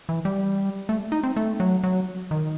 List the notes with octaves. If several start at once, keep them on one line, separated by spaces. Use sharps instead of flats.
E3
G3
A3
D#4
C4
A3
F#3
F#3
D#3